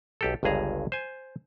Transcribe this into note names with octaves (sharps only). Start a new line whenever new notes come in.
B1 G4 A4
G1 C#2 G2 G#4 A#5
C5 G#5